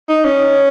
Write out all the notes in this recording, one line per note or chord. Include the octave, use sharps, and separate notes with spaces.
D#4
C#4